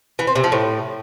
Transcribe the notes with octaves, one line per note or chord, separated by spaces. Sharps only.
E3
C4
C3
F3
A2